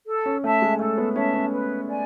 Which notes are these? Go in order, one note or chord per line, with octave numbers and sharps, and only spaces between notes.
A4
C#4
A3 E5 A5
G#3
A3 A4
B3
C#4 E5 A5
C#4
B4
D5 G#5